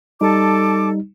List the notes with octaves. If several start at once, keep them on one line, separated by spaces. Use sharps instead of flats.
G3 D#4 A4 A5 D6